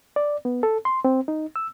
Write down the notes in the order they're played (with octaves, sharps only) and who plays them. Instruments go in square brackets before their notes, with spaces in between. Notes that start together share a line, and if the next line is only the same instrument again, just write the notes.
[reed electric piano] D5
B3
A4
C6
C4
D#4
E6